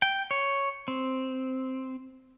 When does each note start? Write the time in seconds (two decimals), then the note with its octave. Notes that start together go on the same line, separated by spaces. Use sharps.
0.02 G5
0.31 C#5
0.88 C4